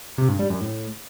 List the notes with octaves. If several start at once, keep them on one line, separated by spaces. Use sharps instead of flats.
C3
G2
G3
F#2
A2